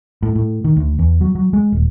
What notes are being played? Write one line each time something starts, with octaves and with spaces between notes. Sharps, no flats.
A2
A2
D#3
D2
E2
F#3
F#3
G#3
D#1